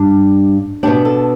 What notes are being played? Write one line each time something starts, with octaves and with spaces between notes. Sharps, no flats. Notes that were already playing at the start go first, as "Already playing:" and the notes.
Already playing: G2 G3 D4 G4
B2 B3 D4 G4
A4